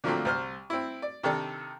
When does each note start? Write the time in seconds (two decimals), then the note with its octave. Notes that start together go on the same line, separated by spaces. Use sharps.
0.04 D3 F3 F#3 A3 A#3 C4
0.25 C2 C5 F6
0.70 C4 E4
1.02 D5
1.23 C3 D#3 D4 A4